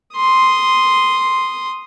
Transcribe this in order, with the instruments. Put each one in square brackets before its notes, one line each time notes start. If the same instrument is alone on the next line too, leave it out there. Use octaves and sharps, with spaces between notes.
[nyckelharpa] C6 D#6